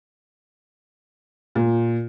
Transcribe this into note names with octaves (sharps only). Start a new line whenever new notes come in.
A#2